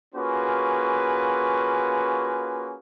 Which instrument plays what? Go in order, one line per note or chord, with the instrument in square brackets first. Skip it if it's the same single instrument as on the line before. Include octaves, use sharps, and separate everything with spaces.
[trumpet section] A#3 C#4 F4 F#4 G#4 B4